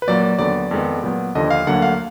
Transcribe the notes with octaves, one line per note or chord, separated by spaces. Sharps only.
B4
A#2 F#3 A#3 D5
D5
D#2 D3 F#3 B3 D5
F2 D#3 G#3 B3
A#2 F#3 B3
D#2 D3 F3 D#5
F5
D2 D3 F#3 A#3 F#5
F5